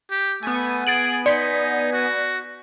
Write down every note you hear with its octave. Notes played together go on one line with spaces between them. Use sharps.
G4
A3 B3 G#5
G#4 A6 D7 F#7
D#4 D5 B6
F#4